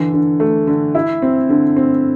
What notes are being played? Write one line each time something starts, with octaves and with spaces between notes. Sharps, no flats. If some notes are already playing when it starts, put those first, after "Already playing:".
Already playing: D3 E3
D3
A3
D3
E4
C4
D3
C4